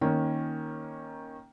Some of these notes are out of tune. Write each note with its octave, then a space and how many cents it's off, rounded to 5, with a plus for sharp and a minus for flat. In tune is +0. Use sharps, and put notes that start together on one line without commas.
D#3 +0 A#3 +5 C#4 -15